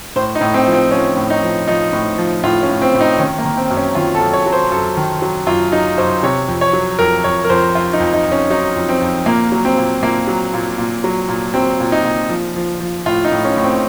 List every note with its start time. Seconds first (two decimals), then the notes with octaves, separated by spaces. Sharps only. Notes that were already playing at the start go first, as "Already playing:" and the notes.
0.16 A2 C5
0.35 D#4
0.41 A2
0.54 C4
0.66 F3
0.73 C4
0.91 F3 C#4
1.17 A2
1.30 D#4
1.43 F3
1.68 F3 D#4
1.93 A2
2.18 F3
2.44 A2 F4
2.63 C#4
2.69 A2
2.82 C4
2.94 A2
3.01 D#4
3.19 D#3 C#4
3.38 A#3
3.45 D#3
3.57 C4
3.70 F#2
3.77 C#4
3.95 D#3 F4
4.15 A4
4.21 F#2
4.33 C#5
4.46 F#3
4.53 C5
4.72 F#2 A4
4.97 D#3
5.22 F#3
5.47 F#2 F4
5.72 F#3 D#4
5.98 F#2 C5
6.23 C3 C#5
6.48 F2
6.61 C#5
6.73 F#3
6.99 F2 A#4
7.24 F2 C#5
7.44 A#4
7.50 F2 C5
7.75 F2 F4
7.93 D#4
8.00 F2
8.13 D#4
8.26 F2
8.32 C#4
8.50 F#3 D#4
8.76 F2
8.89 C4
9.02 F2
9.26 A#2 A#3
9.52 F#3
9.65 C4
9.77 A#2
10.03 A#2 A#3
10.27 F#3
10.54 A#2
10.78 A#2
11.04 F#3
11.29 A#2
11.54 F#3 C4
11.80 A#2
11.92 D#4
12.04 A#2
12.30 F3
12.56 F3
12.80 F3
13.06 A2 F4
13.25 D#4
13.32 A2
13.45 C#4
13.57 A2
13.63 C4